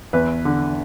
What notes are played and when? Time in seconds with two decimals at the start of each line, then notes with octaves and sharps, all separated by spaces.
0.13 E2 B4
0.45 D3